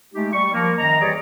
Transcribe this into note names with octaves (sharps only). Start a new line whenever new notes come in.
G#3 A3 D#4 G4
G3 C#6
F3 A#3 A#4
F#2 D#3 D#5 A#5
E3 G3 G4 G#4 C#5 D5